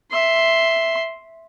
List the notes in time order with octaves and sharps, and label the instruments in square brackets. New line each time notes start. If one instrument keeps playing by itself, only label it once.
[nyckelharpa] E5 C6